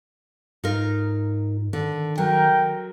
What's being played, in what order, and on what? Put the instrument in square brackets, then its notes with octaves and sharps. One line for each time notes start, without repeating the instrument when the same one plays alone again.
[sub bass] G#2 [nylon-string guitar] D#4 F4 A#4
[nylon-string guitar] D3 [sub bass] D#3
[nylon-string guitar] F#3 [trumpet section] A#4 G5